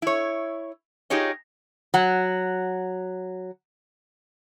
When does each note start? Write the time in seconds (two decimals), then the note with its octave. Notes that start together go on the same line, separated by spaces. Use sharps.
0.02 E4 C#5
1.10 D#4 F4 G4 G#4 C#5 D#5
1.94 F#3 F#5